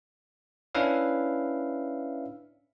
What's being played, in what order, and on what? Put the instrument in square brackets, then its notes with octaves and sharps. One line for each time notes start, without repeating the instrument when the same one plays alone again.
[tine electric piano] C#4 D4 E4 B4 E5 F5